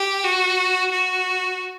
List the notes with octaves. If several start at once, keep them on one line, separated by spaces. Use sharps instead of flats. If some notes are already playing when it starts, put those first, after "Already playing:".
Already playing: G4
F#4
F#4